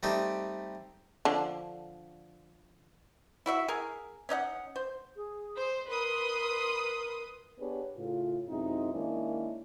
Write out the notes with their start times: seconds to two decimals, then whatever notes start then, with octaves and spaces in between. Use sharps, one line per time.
0.03 G3 A3 C4 D#4 G4
1.25 D3 F3 D4
3.46 E4 F#4 E5
3.68 G#4 A#4
4.29 C#4 D#4 D#5 F#5
4.76 C5
5.16 G#4
5.55 C5
5.89 A#4 B4 C6 D#6
7.59 B3 D4 G4 G#4 B4 C#5
7.96 A2 C#3 F4
8.49 F#2 C3 G#3 C4 D#4 E4
8.93 D#3 G#3 A#3 C#4 D4 E4